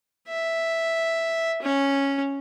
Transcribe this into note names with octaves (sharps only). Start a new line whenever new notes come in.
E5
C#4